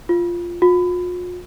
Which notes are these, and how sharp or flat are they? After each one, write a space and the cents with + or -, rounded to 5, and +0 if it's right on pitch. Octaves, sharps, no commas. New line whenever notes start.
F4 -10
F4 +40